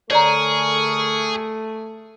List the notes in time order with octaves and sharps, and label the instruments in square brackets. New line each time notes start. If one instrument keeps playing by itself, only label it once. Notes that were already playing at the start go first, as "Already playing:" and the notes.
[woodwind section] D3 A#4 C#6 [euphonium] A3 [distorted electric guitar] G#4 [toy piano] C#5 D5 A#5